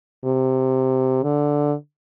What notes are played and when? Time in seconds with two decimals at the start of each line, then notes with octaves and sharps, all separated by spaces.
0.24 C3
1.23 D3